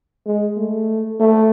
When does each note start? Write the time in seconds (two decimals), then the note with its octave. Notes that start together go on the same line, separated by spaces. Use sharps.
0.26 G#3
0.58 A3
1.20 A3